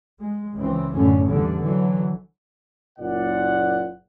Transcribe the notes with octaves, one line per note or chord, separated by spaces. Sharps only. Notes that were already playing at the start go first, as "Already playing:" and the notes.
G#3
C#2 C#3 E3 C4
F#2 A2 D3 C#4
A1 E2 D3 G3
D3 E3 F#3
F#1 A#2 D5 F#5